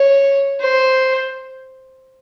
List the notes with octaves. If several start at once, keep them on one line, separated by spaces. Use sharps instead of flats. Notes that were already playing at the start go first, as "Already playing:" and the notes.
Already playing: C#5
C5